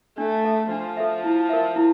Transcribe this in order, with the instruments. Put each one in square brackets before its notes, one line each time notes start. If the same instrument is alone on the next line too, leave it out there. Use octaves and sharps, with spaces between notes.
[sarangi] A3 [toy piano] D4
[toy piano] A4 E5
[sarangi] F3 [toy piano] D4
[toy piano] A4 E5
E4
A#4 E5
E4